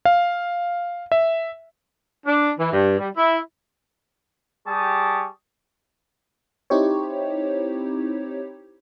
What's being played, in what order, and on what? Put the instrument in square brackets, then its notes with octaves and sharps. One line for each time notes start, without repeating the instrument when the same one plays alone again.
[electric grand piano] F5
E5
[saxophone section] D4
E3
G2
G3
E4
[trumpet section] G3 G4 G#4 A5 C#6 D#6
[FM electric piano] C4 D#4 E4 G4 C5 C#5